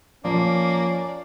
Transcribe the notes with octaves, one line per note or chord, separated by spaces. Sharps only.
F3 A#3 C#4 D5